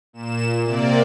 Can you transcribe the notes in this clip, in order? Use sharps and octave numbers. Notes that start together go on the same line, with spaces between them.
A#2 E7
C3 A#3 D5